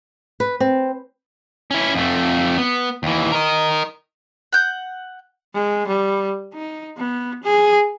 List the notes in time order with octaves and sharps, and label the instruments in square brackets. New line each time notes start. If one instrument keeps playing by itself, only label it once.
[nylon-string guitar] B4
C4
[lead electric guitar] C#4 E4
F2 A3
B3
D#2 E3
A#4 D#5
[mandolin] F#5 G6
[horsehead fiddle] G#3
G3
D#4
B3
G#4